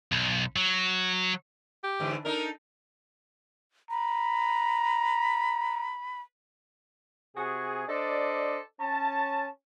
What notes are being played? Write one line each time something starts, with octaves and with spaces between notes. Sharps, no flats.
B1
F#3
G4
G#2 D3 E3
D4 D#4 A4 A#4
A#5 B5
C3 F#4 G#4
D4 A4 C5 D5 D#5
C#4 A5